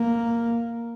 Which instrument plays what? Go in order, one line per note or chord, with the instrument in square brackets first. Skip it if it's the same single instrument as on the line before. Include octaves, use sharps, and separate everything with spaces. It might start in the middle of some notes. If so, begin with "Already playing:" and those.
Already playing: [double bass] A#3